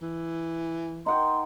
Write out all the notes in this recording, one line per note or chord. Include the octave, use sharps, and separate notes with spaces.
E3
D#4 F#5 G5 C6